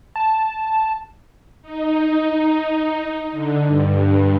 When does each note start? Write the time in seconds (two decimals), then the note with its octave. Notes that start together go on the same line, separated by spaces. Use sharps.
0.16 A5
1.62 D#4
3.32 D3
3.68 G2